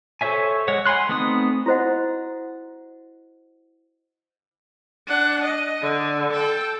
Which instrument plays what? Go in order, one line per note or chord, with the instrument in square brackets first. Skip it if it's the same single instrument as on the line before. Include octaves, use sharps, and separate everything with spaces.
[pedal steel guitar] A4 C5 C#5 E5 G#5
G#3 C#5 F#5
F#5 G#5 B5 C6 F#6
A3 B3 C4 D#4 D#6
[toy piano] E4 F#4 C5 D#5 F#5
[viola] D4 F#5
D#5
D3
A4 G5